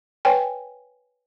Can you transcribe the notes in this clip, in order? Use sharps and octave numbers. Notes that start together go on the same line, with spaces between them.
B4 C#5 G5 G#5